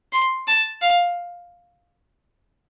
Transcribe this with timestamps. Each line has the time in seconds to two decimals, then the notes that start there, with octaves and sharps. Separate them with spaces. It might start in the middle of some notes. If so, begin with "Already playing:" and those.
0.13 C6
0.47 A5
0.82 F5